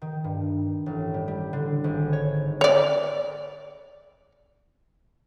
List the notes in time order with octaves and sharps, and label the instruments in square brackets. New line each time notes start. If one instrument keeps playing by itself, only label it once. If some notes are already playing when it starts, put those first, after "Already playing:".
[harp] D#3
G2
A1
G3
G3
D3
G#1
C#5
[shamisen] C#5 D5